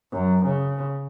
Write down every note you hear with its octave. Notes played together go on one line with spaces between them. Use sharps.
F#2
C#3